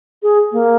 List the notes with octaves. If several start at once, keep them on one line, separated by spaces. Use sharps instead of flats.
G#4
A#3